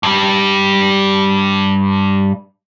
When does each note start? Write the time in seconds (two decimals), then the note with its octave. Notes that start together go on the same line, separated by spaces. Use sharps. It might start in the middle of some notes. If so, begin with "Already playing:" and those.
0.03 G2 G3